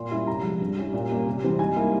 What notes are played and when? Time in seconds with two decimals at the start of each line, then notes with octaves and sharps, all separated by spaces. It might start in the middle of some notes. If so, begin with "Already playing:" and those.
Already playing: A#2 C6
0.11 G3 C#4 E4
0.27 C3 A#5
0.43 F3 G#3
0.60 G2
0.77 G3 C#4 E4
0.93 A#2
1.09 G3 A#3 C#4
1.26 C3
1.44 E3 G3 C4
1.59 G#2 G#5
1.76 G3 A#3 E4